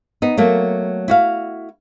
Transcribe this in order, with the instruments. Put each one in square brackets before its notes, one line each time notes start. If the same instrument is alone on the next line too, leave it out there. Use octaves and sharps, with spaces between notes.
[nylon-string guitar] B3 D#4
F#3 A3 A#3
E4 F#4 F5